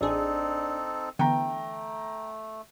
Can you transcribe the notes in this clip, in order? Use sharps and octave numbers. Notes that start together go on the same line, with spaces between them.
A1 C4 D4 D#4 G#4 A4
D3 E3 A3 B3 G5 A#5